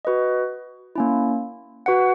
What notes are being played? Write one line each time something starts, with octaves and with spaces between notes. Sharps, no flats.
F#4 B4 D#5
A#3 C#4 E4
F#4 B4 F#5